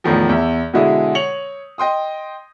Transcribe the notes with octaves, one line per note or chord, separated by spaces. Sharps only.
E2 A2 D#3 F3
E2 E5
B2 D3 G#3 E4 G#4 D#6
C#5 C#7 F7 F#7
D#5 G5 C6 D#6